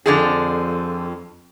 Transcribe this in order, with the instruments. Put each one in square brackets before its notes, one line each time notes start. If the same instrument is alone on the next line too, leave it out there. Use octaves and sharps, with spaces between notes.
[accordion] F2 [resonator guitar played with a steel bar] D3 F3 G#4